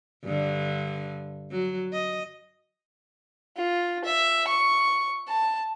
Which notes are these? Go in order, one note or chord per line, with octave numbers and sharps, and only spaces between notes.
G2 D3
F#3
D#5
F4
E5
C#6
A5